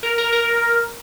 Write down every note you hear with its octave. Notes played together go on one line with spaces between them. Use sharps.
A#4
A#4
A#4